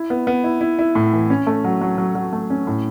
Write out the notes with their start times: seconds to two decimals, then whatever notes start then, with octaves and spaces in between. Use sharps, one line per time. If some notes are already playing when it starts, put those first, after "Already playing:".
Already playing: E4
0.10 B3
0.27 B3
0.44 E4
0.61 E4
0.79 E4
0.95 A2
1.13 E3
1.30 C#4
1.47 A3
1.64 F#3
1.81 F#3
1.98 F#3
2.15 F#3
2.33 A3
2.50 C#4
2.67 A2